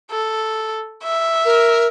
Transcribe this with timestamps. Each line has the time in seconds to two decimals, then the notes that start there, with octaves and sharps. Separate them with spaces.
0.10 A4
1.03 E5
1.44 A#4